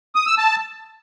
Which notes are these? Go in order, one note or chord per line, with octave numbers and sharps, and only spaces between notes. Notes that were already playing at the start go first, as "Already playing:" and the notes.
D#6
E6
A5